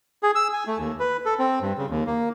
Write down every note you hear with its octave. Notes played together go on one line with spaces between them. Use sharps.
G#4
E6
G#5
A3
D#2
B4
A4
C4
G2
C#3
D#2
A#3